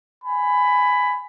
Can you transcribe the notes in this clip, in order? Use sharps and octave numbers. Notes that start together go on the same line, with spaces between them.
G#5 B5